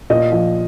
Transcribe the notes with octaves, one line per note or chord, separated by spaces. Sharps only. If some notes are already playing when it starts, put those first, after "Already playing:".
A#2 D#5
F3